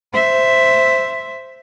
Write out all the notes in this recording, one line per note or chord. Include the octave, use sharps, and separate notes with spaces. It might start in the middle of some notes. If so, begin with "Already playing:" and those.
C5 E5